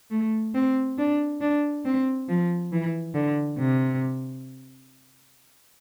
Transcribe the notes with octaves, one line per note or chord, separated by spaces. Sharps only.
A3
C4
D4
D4
C4
F3
E3
D3
C3